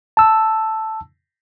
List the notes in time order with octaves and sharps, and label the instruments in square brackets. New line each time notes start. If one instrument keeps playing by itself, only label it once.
[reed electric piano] A5 E6